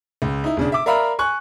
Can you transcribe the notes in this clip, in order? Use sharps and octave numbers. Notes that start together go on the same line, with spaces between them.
C#2
D#4 E4
E1 C#3 D4
E5 D6
A#4 D5 E5 F5 A#5 B5
G#5 C#6 F#6